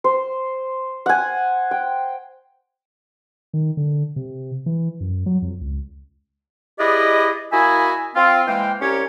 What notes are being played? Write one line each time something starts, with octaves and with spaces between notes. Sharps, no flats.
C5
F#5 G#5
G5
D#3
D3
C3
E3
F#2
F#3
F2
C#2
E4 G4 G#4 B4 D5 D#5
A#3 E4 F#4 D#5 E5 G#5
C4 F4
E3 G#3 A#3 C5 F5 G5
C2 C#4 G4 A#4 C#5